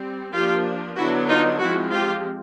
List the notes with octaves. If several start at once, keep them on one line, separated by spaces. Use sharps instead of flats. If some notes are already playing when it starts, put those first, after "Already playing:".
Already playing: G3 C4
F3 A#3 D4 F4 G4
D3 F#3 B3 D4 E4 F#4
D#4 F4
F3 G#3 C4 E4 F#4
F4 G4